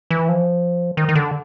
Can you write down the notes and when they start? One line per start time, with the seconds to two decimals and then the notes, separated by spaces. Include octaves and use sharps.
0.11 E3
0.29 F3
0.97 D#3
1.09 D#3
1.15 D3